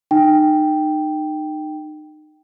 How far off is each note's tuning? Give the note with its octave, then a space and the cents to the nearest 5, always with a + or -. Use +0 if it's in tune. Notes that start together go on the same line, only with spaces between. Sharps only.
D#4 -30 G5 +0